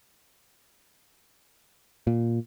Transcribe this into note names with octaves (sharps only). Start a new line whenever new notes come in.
A#2